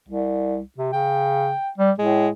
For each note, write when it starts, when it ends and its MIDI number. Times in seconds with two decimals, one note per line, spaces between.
0.08 0.60 36
0.78 0.90 48
0.93 1.53 49
0.93 1.70 79
1.78 1.91 55
1.99 2.29 45
1.99 2.30 56